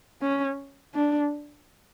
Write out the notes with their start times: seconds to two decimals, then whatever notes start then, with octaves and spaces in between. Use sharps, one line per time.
0.22 C#4
0.95 D4